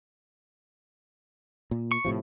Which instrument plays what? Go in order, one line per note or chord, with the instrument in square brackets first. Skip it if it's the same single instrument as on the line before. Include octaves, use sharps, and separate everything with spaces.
[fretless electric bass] A#2
[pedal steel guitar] C#6
[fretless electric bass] A2 C3 F3